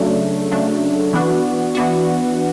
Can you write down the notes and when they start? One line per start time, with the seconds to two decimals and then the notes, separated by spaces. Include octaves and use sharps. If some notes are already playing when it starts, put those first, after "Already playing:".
Already playing: C#3 F#3 A3 D4
0.51 C#3 F#3 A3 D4
1.13 E3 B3 D4 F#4
1.75 E3 B3 D4 F#4